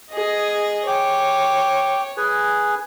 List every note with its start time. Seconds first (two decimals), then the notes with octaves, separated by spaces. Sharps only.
0.11 G#4 D#5
0.87 C#5 G5 D6
2.17 G#4 B4 G#5